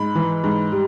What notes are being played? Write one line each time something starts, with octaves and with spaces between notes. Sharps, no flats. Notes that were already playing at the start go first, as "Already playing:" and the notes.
Already playing: G#2 B5
E3
G#2
G3